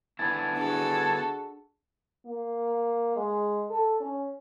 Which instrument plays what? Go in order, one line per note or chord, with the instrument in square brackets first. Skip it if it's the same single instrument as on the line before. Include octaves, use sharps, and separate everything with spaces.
[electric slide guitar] D3 B3 E4 [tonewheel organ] G#5 A5
[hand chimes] D4 G#4 [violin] F#4 A4
[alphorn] A#3
G#3
A4
C#4